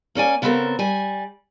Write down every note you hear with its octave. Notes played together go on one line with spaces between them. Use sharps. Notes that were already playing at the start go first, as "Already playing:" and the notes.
A#3 C#4 D5 G#5
C#3 B3 C4 G4 A4 A#4
G3 G#5